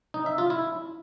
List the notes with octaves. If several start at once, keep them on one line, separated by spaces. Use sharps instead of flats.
D#4
E5
F4
E4